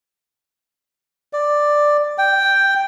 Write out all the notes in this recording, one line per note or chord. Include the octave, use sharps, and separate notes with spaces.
D5
G5